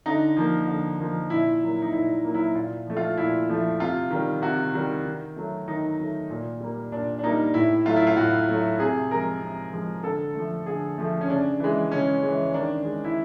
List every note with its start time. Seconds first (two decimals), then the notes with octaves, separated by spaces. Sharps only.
0.06 D3 D#4
0.37 F3 A#3
0.67 D3
0.99 F3 A#3
1.30 A#2 E4
1.62 F#3 A#3
1.82 D#4
1.93 A#2 E4
2.25 F#3 A#3
2.34 E4
2.55 A#2 F4
2.86 F3 A3
2.97 F4
3.17 A#2 E4
3.49 F3 A3
3.80 C3 F4
4.11 D#3 G3
4.42 C3 F#4
4.74 D#3 G3
5.05 D#3
5.36 F#3 A3
5.68 D#3 D#4
5.98 F#3 A3
6.30 A#2
6.60 G3 A#3
6.92 A#2 D4
7.19 D4
7.23 G3 A#3 D#4
7.54 A2 E4
7.86 F#3 A3 F4
7.96 E4
8.07 F4
8.17 A2 F#4
8.48 F#3 A3
8.80 C3 G#4
9.11 F3 G#3 A#4
9.41 C3
9.73 F3 G#3
10.04 D3 A4
10.35 F3 A3
10.66 D3 G#4
10.98 F3 A3
11.21 C#4
11.29 C#3 D4
11.60 E3 G#3
11.92 C#3 C#4
12.23 E3 G#3
12.54 D#3 D4
12.85 G#3
13.04 E4